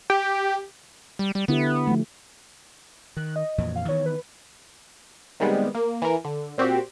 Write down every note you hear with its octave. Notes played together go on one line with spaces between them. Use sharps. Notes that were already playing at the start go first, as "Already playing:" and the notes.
G4
G3
G3
D3 B3 E4 G4
F3 A3
D#3 F#6
D#5
F2 A#2 E3
F5
D#3 E3 B3 C#5
B4
C3 D#3 G3 G#3 B3
A#3
E3 A#4
D3
A#2 C4 F#4 G4